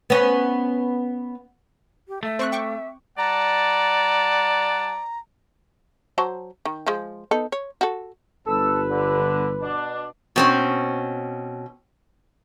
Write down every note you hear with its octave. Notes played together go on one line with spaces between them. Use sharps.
B3 C#4
G4
A3 E5
C4 C#6 F#6
G5 C#6 D6
G3 D5 F#5 A5 A#5
F#3 C5 A5
D#3
F3 G#3
B3 D#4 A4
C#5
F#4 A4
G1 A4 B4 E6
D3
B2 D4
B2 C4 C#4